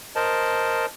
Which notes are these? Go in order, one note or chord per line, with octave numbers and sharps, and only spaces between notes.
A#4 C5 D#5 A5